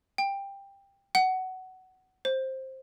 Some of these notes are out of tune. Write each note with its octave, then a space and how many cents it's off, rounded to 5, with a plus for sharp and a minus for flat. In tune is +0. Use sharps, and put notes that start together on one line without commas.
G5 +15
F#5 +15
C5 +10